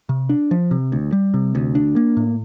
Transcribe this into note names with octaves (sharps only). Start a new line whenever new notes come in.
C3
D4
F3
C3
D2
G3
C3
D2
D4
A#3
A2